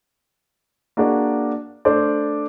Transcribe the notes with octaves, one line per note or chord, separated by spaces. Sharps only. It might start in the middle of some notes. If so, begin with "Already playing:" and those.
A#3 D4 F#4 G#4 D5
A3 D4 C5 D5